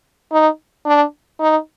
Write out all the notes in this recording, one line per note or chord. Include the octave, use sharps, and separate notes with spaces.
D#4
D4
D#4